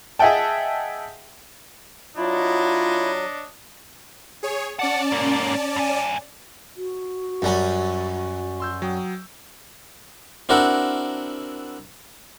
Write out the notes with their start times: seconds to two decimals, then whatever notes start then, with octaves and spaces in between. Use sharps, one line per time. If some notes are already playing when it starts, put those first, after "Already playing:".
0.19 G#4 D#5 E5 F#5 G5 A5
2.17 F#3 D4 E4 F4 C#5 D#5
4.43 G#4 C#5
4.79 C#4 D5 F#5 A5
5.12 G#2 A#3
5.76 G2 G#5
6.77 F#4
7.42 F#2 F#3 G3 C#4
8.60 C6 E6 G6
8.82 F#3 G5 D#6
10.49 C4 D4 E4 F#4 A#4 F#5